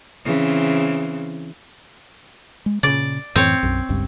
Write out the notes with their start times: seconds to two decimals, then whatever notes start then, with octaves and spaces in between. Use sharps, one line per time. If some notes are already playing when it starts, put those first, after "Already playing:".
0.25 C#3 E3 C4
2.66 G#3
2.83 A#2 C#3 D5
3.36 F#2 A2 E3 C4 C#5
3.63 B1 F#2
3.89 G1 C#2 G2